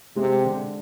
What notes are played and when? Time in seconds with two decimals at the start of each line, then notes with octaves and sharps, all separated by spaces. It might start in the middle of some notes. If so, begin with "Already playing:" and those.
0.16 C3 G#3
0.46 D3